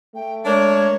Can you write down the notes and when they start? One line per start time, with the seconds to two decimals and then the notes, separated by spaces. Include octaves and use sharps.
0.15 A3 G5
0.45 G#3 D4 A#4 C#5